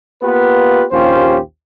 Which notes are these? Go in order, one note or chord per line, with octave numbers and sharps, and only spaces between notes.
A#3 B3 F4 G4 B4
A#1 D#2 C#4 F4 G4 C5